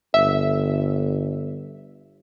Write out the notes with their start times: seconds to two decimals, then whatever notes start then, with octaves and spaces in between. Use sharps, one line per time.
0.14 G1 E5